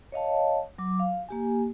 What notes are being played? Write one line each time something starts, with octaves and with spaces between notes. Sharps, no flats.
C#5 D#5 F5 A5
F#3 D6
F5
A#3 G4 G#5